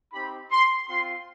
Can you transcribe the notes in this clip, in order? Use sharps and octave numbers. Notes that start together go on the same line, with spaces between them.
C4 D#4 G4 B5
C6
C4 F4 C6